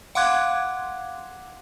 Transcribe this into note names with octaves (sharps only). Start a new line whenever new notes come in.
F5 F#5 C6 D6 F#6 G#6